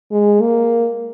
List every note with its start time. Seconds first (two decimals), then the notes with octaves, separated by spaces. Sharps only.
0.12 G#3
0.42 A#3